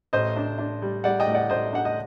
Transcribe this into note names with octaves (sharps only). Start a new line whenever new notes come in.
A1 C5 D#5
D4
D4
G3
G3 D5 F#5
D#5 G5
A2
D5 F#5
A1 C5 D#5
D4 F#5
D#5